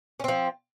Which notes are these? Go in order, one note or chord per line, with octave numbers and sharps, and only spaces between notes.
F3 C4 C#4